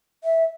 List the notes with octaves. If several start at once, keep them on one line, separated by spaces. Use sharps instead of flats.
E5